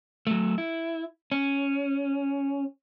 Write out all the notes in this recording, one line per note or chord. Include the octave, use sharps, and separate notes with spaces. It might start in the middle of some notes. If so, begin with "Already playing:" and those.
F#3 A3
E4
C#4